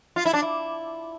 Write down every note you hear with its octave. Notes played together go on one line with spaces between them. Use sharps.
F4
E4
D4
E4